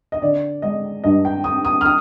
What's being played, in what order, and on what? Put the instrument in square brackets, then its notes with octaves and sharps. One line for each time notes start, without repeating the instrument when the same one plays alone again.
[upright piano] D#5
D3 D5
G#3 D#5
G2 D#5
G5
C4 D#6
D#6
F6
D#6